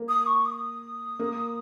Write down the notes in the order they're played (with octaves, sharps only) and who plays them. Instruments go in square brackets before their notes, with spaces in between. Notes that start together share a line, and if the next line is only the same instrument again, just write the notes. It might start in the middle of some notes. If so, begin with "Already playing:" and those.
Already playing: [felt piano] A#3
[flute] D#6
C#6
D#6
[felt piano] A#3